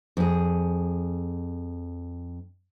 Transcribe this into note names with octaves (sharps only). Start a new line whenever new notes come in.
F2 G#4